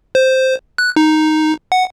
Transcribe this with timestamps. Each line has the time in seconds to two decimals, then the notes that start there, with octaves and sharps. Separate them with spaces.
0.15 C5
0.78 F#6
0.96 D#4
1.72 F#5